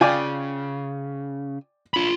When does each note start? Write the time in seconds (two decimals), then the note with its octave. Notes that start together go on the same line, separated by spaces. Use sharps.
0.01 C#3 F4 D5 G5 G#5
1.94 F4 B5